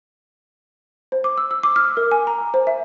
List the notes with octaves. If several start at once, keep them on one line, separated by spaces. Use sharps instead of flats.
C5
D6
E6
E6
D6
F6
A#4
G#5
A#5
C5
E5